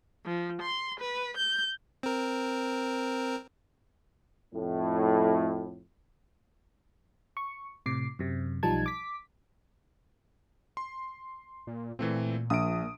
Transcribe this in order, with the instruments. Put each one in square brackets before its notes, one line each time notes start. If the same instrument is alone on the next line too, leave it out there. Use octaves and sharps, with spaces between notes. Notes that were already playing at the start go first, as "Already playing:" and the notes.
[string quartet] F3
C6
B4
G6
[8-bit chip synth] C4 A#4
[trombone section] F2 A2
[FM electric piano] C#6
A2 C3 D6 C7
F#2 C3
B1 F3 G3 D#4 A5 G#6
D6 B6
[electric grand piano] C6
[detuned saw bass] A#2
[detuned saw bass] A#2 [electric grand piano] E3 A3 C4
[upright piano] A#1 [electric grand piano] D#6 D7